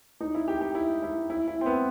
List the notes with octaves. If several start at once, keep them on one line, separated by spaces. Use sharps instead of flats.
D#4
E4
G4
G4
E4
E4
E4
E4
C4
B3